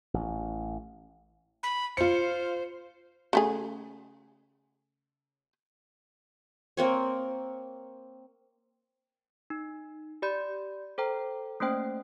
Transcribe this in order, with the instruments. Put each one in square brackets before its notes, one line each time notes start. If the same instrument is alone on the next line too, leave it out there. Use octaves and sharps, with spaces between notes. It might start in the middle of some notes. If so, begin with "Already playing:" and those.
[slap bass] A1
[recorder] B5
[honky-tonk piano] F4 C#7 [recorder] C5
[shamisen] C#3 A3 G#4
[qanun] A#3 C4 C#5
[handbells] D#4
G4 D5 B5 G6
A4 C5 G5 A#5
A3 A#3 C#4 C5 G5